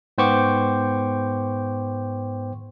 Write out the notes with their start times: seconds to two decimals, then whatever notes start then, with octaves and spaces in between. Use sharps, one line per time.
0.18 G#2 B3 C5 G5 C#6 D6